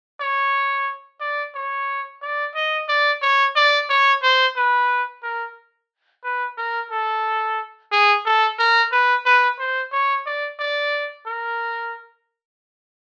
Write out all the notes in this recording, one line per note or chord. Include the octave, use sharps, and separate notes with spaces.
C#5
D5
C#5
D5
D#5
D5
C#5
D5
C#5
C5
B4
A#4
B4
A#4
A4
G#4
A4
A#4
B4
B4
C5
C#5
D5
D5
A#4